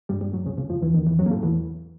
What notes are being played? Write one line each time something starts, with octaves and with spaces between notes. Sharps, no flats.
G2 G3
G2 G3
F#2 F#3
C#2 C#3
C#2 C#3
F2 F3
E2 E3
D#2 D#3
E2 E3
F#2 F#3
A#3
A2 A3
E2 E3